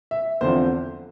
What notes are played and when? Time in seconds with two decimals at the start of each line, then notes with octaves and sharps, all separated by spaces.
0.11 E5
0.41 E2 D3 F3 C4 C5